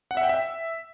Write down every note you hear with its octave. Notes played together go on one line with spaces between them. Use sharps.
F#5
E5
G5
E5